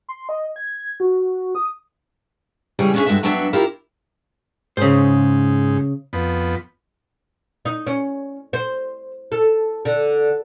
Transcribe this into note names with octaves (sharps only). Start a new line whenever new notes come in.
C6
D#5
G#6
F#4
D#6
C#3 E3 G3 G#4 C#5
B3 C#4 D4 E4 G#4 E5
G2 G#3 F#4 A4 E5
G2 F#3 B3 D4 E5
E4 F4 G4 A#4
G#2 C#3 C5
F2 B3
D#4
C#4
C5
A4
D3